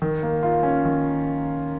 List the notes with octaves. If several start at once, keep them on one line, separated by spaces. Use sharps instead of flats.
D#3
A#3
F4
C#4
D#3